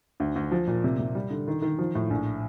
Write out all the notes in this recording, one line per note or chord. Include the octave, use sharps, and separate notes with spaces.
D2
D2
F3
A#2
C3
C3
G3
D3
D#3
D#3
F3
A2
A#1